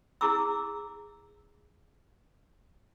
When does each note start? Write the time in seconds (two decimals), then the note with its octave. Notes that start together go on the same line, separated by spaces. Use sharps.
0.21 E4 G#4 A#5 D6 E6